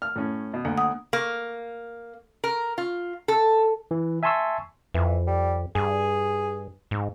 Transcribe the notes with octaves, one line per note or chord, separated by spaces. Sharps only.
F6
A2 C#4
B2
D2 A#3
F#5 D#6
A#3
A#4
F4
A4
E3
E5 G#5 A5 C6 C#6 E6
F2 E3
G3
G2 G#4
G#2